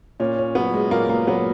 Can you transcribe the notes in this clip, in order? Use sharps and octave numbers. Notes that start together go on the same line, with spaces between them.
A#2 C#4
C#4
F#3 B3
G#3
A#2 A#3
A#3
F#3 B3